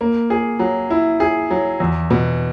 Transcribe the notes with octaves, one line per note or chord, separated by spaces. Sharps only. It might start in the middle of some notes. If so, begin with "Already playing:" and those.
A#3
G#4
F#3
E4
G#4
F#3
E2
B2